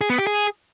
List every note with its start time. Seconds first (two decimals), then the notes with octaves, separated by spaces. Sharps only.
0.01 G#4
0.10 B3
0.18 G4
0.27 G#4